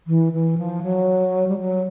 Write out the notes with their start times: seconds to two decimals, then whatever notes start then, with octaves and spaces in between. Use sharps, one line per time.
0.07 E3
0.33 E3
0.58 F3
0.83 F#3
1.48 G3
1.58 F#3